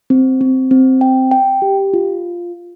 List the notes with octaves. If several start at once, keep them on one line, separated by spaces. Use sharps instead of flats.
C4
C4
C4
G5
G5
G4
F4